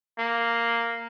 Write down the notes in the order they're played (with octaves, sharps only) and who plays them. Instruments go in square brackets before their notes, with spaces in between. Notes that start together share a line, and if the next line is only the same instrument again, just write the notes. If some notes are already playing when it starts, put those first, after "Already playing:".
[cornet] A#3